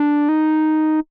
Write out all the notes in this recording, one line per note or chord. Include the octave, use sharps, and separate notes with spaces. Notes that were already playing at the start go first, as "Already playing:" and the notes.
Already playing: D4
D#4